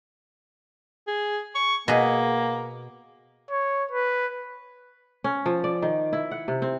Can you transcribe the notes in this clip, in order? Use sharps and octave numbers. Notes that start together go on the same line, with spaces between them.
G#4
C#6
B2 A#3 G#4
C#5
B4
C#4
F3
D5
D#3
E4
F#5
C3
C4